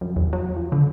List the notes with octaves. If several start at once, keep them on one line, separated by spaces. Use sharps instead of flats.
F#2
E2
F#3
F3
D3